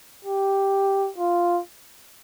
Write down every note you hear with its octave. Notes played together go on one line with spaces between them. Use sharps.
G4
F4